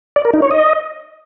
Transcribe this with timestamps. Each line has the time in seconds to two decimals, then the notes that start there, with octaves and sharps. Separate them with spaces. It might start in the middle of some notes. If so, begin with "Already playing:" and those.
0.16 D5
0.25 A#4
0.33 D#4
0.42 C#5
0.51 D#5